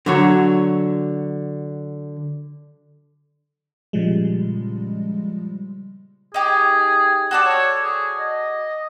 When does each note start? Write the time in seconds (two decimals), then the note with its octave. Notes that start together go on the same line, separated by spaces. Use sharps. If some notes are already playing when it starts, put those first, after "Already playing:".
0.06 D3 F#3 C#5
3.93 A#2 C#3 F3 G3 G#3
6.34 D#4 G4 G#4
7.31 F#4 A4 D5
7.44 C#5
7.84 G#4
8.19 D#5